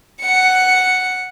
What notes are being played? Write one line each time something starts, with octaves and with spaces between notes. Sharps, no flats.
F#5 C#7